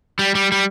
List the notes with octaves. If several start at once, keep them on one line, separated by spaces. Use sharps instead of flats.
G3
G3
G3